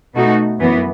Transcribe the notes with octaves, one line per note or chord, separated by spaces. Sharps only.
B2 A3 D#4 F#4
F#2 E3 B3